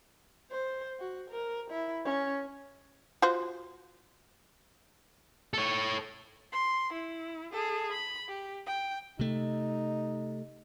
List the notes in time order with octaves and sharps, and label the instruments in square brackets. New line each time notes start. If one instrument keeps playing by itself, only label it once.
[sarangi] C5
F#4
A#4
E4
C#4
[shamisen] F4 F#4 C5
[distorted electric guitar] A4 C#5
[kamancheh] C6
E4
G#4 A4
B5
G4
G5
[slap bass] C3 A3 [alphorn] D#4